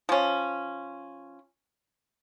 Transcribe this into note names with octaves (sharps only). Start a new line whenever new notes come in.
F3 C#4